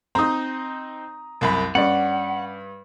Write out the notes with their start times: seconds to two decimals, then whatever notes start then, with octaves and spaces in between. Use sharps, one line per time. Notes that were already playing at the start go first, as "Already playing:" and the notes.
0.15 C4 D#4 A#5 D#6
1.41 C2 F#2 B5
1.75 G2 C#4 D5 F#5